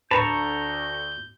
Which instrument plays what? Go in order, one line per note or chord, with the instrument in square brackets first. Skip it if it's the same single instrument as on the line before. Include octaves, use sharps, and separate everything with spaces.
[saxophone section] D2 [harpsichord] B4 [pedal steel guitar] A5 A#5 C#6 [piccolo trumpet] G6